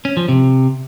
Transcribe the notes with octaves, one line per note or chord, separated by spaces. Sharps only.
C#4
F3
C3